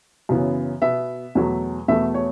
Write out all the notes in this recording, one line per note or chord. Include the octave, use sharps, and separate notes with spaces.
F#2 C#3 E3 B3
B2 B3 E5
E2 B2 F#3 A3
E2 B2 A3 E5
C#5